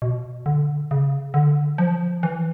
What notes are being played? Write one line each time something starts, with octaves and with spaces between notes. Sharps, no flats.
B2
D3
C#3
D3
F3
E3